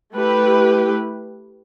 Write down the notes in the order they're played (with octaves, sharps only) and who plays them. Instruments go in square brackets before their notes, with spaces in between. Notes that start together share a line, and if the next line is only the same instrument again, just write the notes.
[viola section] A3 E4 G4 B4